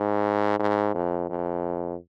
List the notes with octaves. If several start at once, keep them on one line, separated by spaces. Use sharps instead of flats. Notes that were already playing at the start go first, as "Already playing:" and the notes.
Already playing: G#2
G#2
F2
F2